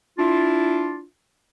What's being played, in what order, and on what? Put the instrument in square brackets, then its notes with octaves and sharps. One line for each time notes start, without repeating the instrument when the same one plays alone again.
[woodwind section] D4 E4 F4